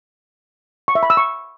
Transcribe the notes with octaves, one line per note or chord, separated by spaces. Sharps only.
C#6
E5
B5
E6
C#6